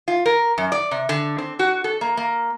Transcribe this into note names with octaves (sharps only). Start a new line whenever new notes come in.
F4
A#4
F#2
D5
C3
D3
C4
F#4
A4
A#3
A#3